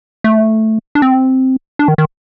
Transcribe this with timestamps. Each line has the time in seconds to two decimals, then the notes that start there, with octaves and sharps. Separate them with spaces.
0.24 A3
0.95 D4
1.02 C4
1.79 D4
1.88 D#3
1.98 D#3